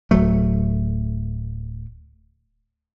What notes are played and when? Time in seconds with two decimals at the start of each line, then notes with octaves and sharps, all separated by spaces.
0.11 D1 F#3 A3